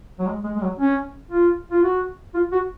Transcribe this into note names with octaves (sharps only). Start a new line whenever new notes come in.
F#3
G#3
G#3
G#3
F#3
C#4
F4
F4
F#4
F4
F#4